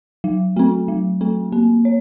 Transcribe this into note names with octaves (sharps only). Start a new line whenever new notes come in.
F#3
A3 C4
F#3
A3 C4
A#3
C#5